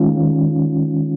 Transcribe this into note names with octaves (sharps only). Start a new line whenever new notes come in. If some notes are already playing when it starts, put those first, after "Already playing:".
Already playing: D#3 G#3 C#4 F4